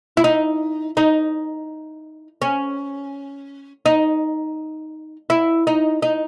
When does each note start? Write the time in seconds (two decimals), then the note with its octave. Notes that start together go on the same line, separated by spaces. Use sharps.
0.17 E4
0.24 D#4
0.97 D#4
2.42 C#4
3.86 D#4
5.30 E4
5.67 D#4
6.02 D#4